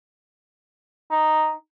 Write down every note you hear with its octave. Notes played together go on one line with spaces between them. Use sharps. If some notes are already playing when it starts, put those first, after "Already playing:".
D#4